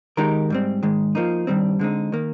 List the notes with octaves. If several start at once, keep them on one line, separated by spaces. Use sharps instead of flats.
D#3 G#3 D#4 G4 A#4
G#2 G3 C4
G#2 D#3 G#3
F3 A#3 D#4
G2 D#3 G3 C4
D3 G#3 C4 D#4
D#3 A#3